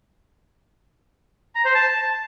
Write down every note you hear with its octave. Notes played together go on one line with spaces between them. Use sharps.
A#5
C5
A5